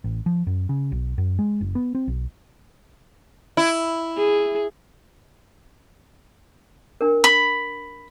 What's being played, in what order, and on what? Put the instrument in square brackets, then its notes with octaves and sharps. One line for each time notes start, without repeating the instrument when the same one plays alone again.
[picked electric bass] A1
F3
F#2
C#3
B1
F#2
G#3
F#1
B3
C4
B1
[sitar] E4
[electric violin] G#4
[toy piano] D4 A#4
[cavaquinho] B5